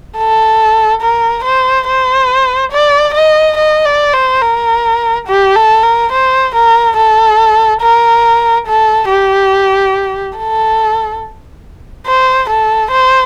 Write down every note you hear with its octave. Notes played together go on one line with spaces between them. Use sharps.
A4
A#4
C5
C5
D5
D#5
D#5
D5
C5
A#4
G4
A4
A#4
C5
A#4
A4
A#4
A4
G4
A4
C5
A4
C5